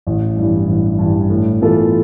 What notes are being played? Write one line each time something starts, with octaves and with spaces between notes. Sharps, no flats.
A1
G2 E3
A1
G2
E3
A2
E3 B3 F4 A4